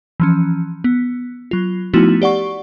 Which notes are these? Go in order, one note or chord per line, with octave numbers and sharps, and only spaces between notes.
E3 F3 C#4
B3
F#3 F4
F3 A3 B3 D#4 E4 F#4
G4 D5 F#5 C#6